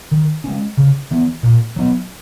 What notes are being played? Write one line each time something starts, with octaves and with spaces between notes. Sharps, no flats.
D#3
G#3 C#4
C#3
E3 B3
A#2
F#3 B3